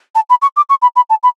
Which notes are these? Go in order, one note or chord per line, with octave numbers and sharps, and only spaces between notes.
A5
B5
C#6
D6
C#6
B5
B5
A5
B5